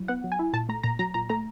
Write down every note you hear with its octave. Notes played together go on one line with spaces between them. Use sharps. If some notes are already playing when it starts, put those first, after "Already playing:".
Already playing: F#3 E4
B3 F#5
F#3
G#5
E4
A#2 A5
A3 A#5
A#2 A#5
F#3 A#5
A#2 A#5
A3 A#5